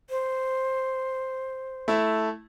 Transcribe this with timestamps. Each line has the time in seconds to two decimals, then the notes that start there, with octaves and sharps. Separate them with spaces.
0.10 C5
1.88 A3 E4